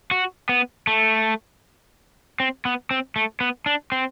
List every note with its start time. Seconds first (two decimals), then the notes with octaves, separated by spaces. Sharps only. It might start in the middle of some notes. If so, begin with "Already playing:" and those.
0.11 F#4
0.49 B3
0.87 A3
2.40 C4
2.65 B3
2.91 C4
3.16 A3
3.40 B3
3.66 D4
3.92 C4